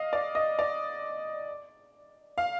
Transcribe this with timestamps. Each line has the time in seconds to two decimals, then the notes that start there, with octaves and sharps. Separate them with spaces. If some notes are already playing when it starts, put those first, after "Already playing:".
Already playing: D#5 F5
0.13 D5
0.35 D#5
0.59 D5
2.38 F5